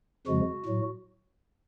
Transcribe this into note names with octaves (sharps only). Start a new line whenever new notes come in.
F2 C#3 F3 G#3 F#4
A2 F#3